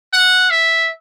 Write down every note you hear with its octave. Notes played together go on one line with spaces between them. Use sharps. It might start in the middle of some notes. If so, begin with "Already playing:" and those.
F#5
E5